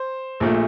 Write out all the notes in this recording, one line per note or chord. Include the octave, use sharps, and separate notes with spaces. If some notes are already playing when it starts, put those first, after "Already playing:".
Already playing: C5
A#1 A#2 A3